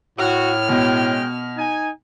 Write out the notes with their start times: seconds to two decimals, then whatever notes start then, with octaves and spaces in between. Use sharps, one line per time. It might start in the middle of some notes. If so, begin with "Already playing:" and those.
0.19 A2 F#4 F6
0.69 B2 G#3 C#4 G5
1.57 D#4 G#5